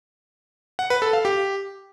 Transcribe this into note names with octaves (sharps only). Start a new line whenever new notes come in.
F#5
B4
A4
F5
G4